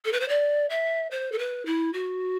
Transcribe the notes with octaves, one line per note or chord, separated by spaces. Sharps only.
A4
B4
C5
D5
E5
C5
A4
B4
E4
F#4